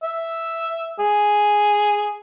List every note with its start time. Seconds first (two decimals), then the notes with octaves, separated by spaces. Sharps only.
0.03 E5
0.99 G#4